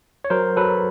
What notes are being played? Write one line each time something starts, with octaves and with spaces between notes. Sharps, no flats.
C#5
F#3 A#4 C5
F#3 A4 B4